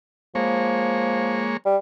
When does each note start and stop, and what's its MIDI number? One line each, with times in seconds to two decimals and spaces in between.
0.35 1.50 53
0.35 1.57 56
0.35 1.57 58
0.35 1.57 73
1.65 1.77 55